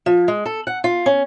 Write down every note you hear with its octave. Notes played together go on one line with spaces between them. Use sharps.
F3
G#3
A4
F#5
F4
C#4